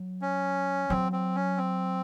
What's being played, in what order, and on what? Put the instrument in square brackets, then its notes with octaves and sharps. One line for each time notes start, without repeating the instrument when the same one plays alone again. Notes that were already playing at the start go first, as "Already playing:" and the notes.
Already playing: [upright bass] F#3
[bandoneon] C#4
[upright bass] F#3 [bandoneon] C4
[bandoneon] C4
C#4
C4